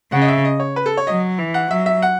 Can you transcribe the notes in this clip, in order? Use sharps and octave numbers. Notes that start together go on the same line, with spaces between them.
C#3 F#5
D#5
E5
D#5
C#5
B4
A4
C#5
F#3 D#5
E3
F#5
F#3 E5
E5
F#5